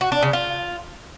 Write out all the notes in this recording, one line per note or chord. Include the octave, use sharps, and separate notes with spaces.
F#4
D4
C#3
F4